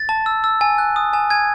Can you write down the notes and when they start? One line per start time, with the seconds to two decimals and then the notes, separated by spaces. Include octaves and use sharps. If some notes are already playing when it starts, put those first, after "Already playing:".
Already playing: A6
0.09 A5
0.26 E6
0.44 E6
0.61 G#5
0.78 F#6
0.96 D#6
1.13 G#5
1.30 G#5 G#6